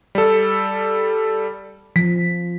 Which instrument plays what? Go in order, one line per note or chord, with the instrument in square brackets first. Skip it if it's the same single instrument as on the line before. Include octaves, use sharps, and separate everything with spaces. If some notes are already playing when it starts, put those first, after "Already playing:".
[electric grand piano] G3 A4
[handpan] F3 [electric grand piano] B6